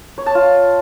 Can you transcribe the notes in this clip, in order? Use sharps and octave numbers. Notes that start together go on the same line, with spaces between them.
C#5
A5
F4